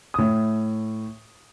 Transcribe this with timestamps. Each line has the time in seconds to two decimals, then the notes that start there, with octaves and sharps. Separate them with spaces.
0.14 A2 D#6